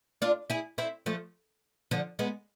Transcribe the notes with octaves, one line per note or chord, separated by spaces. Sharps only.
D4 F4
E4 G#4
C4 E4
F3 A3
D3 F3
G#3 B3